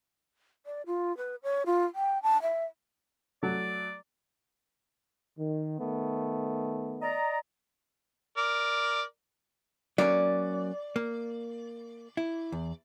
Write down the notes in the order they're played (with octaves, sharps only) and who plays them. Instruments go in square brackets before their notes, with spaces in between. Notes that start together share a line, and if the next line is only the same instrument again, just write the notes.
[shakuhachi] D5
F4
B4
C#5
F4
G5
A5
E5
[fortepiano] F#3 A3 [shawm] D5
[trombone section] D#3
D#3 A3 B3
[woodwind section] D5 D#5 A#5
[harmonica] A#4 D5
[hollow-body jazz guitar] F#3 A#3 C#4 [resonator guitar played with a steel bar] D5
[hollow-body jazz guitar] A#3
E4
E2